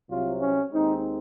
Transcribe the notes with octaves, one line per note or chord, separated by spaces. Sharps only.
C2 C3 F#3 C4 F4
C#4
D#2 D#3 G#3 C4 D#4